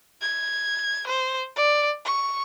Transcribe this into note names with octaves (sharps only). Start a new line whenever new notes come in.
G#6
C5
D5
C#6